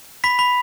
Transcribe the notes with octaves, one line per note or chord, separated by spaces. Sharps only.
B5 B6
B5